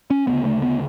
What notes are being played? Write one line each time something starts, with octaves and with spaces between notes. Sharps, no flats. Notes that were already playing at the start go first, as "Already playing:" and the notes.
C#4
D2 C#3 B3
A3
B3